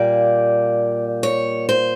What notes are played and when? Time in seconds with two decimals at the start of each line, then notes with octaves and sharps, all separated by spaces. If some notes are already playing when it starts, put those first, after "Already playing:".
Already playing: A#2 G3 A#3 D5
1.23 C#5
1.69 C5